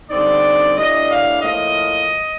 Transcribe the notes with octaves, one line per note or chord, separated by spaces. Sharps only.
D3 G3 C4 D#4 D5
A2 G3 D4 D#5
F5
A2 F3 A#3 D#5